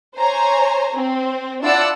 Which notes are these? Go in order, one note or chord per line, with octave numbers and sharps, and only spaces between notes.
C5 C#5 G#5 A#5
C4
D4 E4 F4 D5 F#5 E6